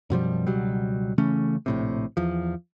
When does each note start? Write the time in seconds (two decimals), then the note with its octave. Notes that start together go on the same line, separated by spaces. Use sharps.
0.10 F#2 B2 F3 G3
0.47 C#2 B2 F#3 G3
1.18 C#3 E3 A3 C#4
1.66 A#1 A2 C3
2.17 E2 F3